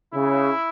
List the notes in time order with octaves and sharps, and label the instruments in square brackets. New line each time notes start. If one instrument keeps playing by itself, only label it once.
[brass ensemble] C#3 [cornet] E4